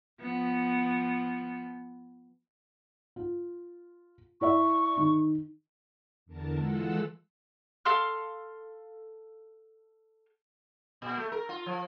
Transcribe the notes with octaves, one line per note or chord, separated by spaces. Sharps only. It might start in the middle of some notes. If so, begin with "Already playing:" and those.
F3 B3
F4
E4 D5 E5 C#6
D#3
E2 D3 A#4 A5
E3 G#3 F4 A4 F#5 E6
A4 F5 C6 F6
A#2
A3
A#4
F4
F3